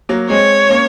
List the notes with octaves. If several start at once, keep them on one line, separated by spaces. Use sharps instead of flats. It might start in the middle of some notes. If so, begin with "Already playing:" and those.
F#3 A#3
G#3 C4 C#5
A#3 C#4